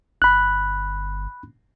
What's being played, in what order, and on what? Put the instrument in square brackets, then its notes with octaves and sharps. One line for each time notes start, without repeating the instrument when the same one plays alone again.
[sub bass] G1 [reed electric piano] B5 F#6